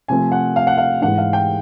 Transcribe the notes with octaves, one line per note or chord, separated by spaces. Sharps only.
C3 F3 A3 C4 G#5
F#5
F5
F#5
F5
G#2 E3 G#3 F#5
F5
G5